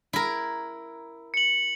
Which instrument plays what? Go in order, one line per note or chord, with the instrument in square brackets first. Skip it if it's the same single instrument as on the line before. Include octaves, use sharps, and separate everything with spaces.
[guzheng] E4 A#4
[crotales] C#7 F#7